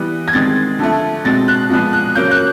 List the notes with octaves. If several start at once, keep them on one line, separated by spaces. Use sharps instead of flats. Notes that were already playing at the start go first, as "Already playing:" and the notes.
Already playing: E3 G3 B3
G#6
D#3 G#3 C4 A6
D3 F3 A3
B2 G#3 C4 A6
F#6
A#2 F3 G#3 B3
F#6
C#3 F#3 A#3 G6
F#6